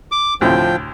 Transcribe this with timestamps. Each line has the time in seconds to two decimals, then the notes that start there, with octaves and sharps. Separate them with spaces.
0.12 D6
0.41 D2 A2 C3 F3 G5